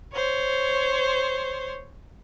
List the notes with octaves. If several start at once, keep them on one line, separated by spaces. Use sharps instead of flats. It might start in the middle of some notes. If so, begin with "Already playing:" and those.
C5 C#5